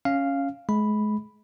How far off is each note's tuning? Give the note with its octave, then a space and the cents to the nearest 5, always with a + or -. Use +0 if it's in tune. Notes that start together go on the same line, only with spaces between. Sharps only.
C#4 +0 F5 -5
G#3 +35 B5 +0